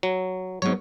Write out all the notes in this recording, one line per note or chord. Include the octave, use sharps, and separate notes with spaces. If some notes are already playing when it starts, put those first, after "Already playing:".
F#3
G#2 F#3 B3 C4 C#5